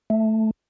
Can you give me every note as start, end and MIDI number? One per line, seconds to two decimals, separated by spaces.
0.10 0.51 57